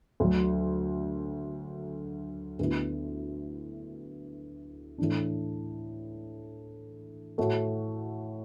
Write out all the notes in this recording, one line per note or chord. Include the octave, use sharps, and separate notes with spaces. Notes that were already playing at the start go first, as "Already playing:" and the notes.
D2 D3 F#3
D2 D3 B3 E4
A2 E3 D4
A2 A3 F#4